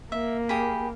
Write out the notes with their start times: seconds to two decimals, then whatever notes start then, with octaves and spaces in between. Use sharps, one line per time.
0.12 A#3 E5
0.49 G4 G#4 B5